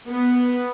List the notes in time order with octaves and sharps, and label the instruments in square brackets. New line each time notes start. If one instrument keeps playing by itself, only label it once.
[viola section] B3